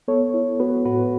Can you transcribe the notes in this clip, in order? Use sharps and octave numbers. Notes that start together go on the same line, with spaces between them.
B3 A4 C#5
E4
B3 F#4 B4
A2 F#4 B4